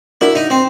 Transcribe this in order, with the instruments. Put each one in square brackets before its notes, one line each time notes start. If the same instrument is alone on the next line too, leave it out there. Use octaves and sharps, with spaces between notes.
[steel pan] D4 F#4 A#4 D5 [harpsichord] E4
[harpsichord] D#4
C4